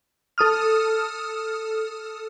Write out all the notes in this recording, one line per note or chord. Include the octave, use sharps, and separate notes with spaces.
A4 D#6 F6